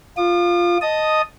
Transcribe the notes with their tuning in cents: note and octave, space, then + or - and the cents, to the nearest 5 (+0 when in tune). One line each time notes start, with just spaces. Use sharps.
F4 +0 D#6 -45
D#5 +0 A5 +0 D#6 +0